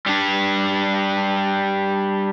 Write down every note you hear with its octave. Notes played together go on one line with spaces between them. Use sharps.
G3 D4